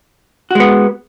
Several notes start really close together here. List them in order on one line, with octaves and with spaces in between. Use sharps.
F#4 G#3 B3